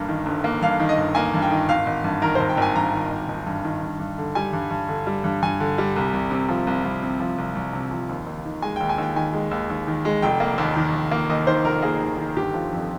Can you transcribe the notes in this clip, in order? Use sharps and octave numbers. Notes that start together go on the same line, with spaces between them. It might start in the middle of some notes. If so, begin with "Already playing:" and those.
Already playing: G1 G2 A#3
D#3
G1
A#3
G2 F5
D#3
D#5
G1
A#3 G#5
G2
G5
D#3
G#1 F5
G#1
G2
D#3 A#4
C5
G#1
G5
G#1 G#5
G2 A#5
D#3
G#1
G#1
G2
D#3
G2
G2
D3
G3 G#5
G2
G2
D3
G3
G2
G2 G#5
D3
G3
C2
C2
C3
F3
C2
C2
C3
F3
C2
C2
C3
F3
D#2
D#2
D#3
G#3 G#5
G5
D#2
G#5
D#2 G5
D#3 G#5
G#3
D#2
D#2
D#3
G#3
F1 G5
A#3
D#2
D#3
F1
A#3
D#2 D#5
D#3 C5
F1 A#4
A#3 G#4
D#2
D#3
G1 G4
F3
F2